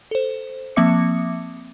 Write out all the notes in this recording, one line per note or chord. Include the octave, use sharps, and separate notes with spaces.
A4 C5
F3 A#3 C4 E5 D6 C#7